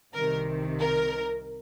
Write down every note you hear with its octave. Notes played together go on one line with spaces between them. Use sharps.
C2 C3 D#3 A#4
A#4